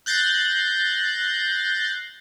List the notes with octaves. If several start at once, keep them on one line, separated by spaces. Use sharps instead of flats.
F#6 G6 A6 A#6 C7